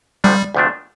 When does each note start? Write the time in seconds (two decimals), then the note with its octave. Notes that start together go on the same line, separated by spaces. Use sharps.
0.24 D2 C3 F3 G3 A3 D4
0.55 D2 C3 F3 A3 D4